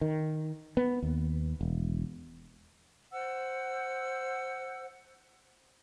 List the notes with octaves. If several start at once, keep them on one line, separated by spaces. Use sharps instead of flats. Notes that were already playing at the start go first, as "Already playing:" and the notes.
D#3
B3
D#2
E1
C5 F#5 E6